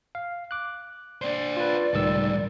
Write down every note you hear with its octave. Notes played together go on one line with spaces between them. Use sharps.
F5
D6 F#6
D4 C5 D5
F4 B4
C#2 A2 D#3 G3 E6